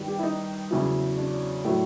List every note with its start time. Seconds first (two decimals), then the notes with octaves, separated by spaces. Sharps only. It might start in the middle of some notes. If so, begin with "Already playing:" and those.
Already playing: G2 D#3 G3
0.08 G4
0.19 E4
0.23 D#4
0.71 E2 C#3 F#3 E4
1.17 D4
1.65 A2 F#3